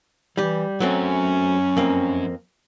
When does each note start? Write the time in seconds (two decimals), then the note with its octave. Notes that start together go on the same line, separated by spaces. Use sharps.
0.37 E3 G3 G4
0.80 F#2 F#3 A3 C4 C#4
1.77 F2 A#3 C4